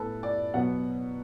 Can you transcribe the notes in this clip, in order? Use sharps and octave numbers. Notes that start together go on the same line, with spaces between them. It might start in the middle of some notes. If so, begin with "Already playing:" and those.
Already playing: A2 B3 A4 B4
D5
B2 F#3 B3 F#5